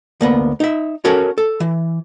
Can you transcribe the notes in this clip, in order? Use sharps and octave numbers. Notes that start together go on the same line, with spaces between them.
D2 A#3 B3
D#4 E5
C#4 F#4 A4 A#4 C#5
A4
E3